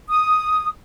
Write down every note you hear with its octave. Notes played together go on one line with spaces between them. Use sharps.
D#6